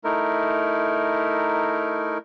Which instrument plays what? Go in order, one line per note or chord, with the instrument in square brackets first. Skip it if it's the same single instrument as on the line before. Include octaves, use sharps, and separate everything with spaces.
[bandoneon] A3 D#4 E4 A#4